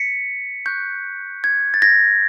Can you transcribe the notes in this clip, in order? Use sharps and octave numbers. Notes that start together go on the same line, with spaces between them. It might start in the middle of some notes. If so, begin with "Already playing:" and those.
Already playing: B6 C#7
C#6 F#6 G6
G#6
A6
G#6 A#6